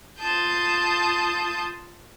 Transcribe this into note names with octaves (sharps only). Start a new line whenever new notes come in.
F4 A5 D#6 G6